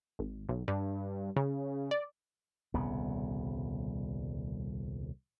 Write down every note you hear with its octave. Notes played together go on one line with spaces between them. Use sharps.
G#1
B1
G2
C#3
D5
D#1 C2 C#3 B3